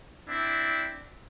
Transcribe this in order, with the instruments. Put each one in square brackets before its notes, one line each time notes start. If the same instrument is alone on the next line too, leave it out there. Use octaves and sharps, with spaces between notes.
[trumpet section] C4 D4 E4